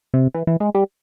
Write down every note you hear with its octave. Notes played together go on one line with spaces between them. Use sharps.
C3
E3
E3
G#3
G3